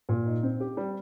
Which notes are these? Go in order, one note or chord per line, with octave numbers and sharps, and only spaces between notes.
A#2
D#4
C4
G4
G3